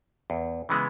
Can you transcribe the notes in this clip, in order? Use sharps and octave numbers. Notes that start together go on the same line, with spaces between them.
E2
C#3 E3 G#3 B3